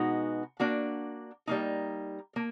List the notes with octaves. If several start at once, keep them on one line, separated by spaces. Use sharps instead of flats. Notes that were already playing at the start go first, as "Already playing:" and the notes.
Already playing: B2 G#3 B3 D#4 F#4
A#3 D4 F#4
G3 A#3 D#4
A#3